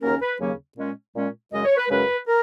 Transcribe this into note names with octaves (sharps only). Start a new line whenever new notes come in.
D#2 C#3 F#3 A#3 C#4 A#4
B4
D#2 C#3 F#3 A#3 C#4
A#2 G#3 C#4
A#2 G#3 C#4
F#2 C#3 G#3 C#4 D#5
C#5
B4
F#2 C#3 G#3 C#4 B4
A#4